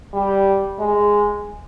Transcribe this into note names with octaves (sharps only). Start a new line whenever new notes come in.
G3
G#3